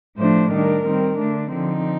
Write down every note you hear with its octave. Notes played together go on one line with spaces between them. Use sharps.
A2 F3 A3 D4 C5
D#3 G3 D4 A#4
D#3 G3 C4
D3 A3 D4
D3 F3 C4 D#4